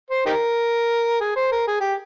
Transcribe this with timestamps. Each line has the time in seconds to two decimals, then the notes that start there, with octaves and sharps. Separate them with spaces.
0.10 C5
0.26 D#4 G4 A#4
1.21 G#4
1.36 C5
1.52 A#4
1.68 G#4
1.81 G4